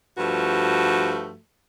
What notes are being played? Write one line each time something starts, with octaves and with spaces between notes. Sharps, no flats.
G2 F3 A3 F#4